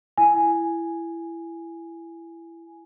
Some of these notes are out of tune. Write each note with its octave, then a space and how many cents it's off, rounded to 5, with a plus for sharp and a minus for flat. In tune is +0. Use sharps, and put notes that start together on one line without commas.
E4 +20 G#5 +0